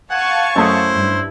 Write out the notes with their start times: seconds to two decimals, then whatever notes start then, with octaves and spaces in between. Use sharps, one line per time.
0.11 F5 F#5 G#5 A5 C#6
0.56 F#2 A3 E4 C5 D#6
0.95 G2